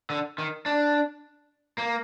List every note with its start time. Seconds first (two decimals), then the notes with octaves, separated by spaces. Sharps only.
0.10 D3
0.38 D#3
0.66 D4
1.78 A#3